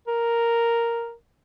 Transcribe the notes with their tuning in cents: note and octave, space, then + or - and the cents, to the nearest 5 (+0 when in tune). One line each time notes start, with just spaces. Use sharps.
A#4 +0